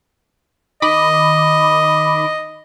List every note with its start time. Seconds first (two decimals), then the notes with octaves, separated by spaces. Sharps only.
0.82 D#3 D#5 B5 D6